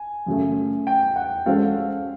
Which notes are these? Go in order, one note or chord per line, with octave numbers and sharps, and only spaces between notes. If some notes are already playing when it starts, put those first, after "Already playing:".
Already playing: G#5
F#2 C#3 F#3 A3
G5
F#5
G#3 C#4 F#4 A4 C5 F5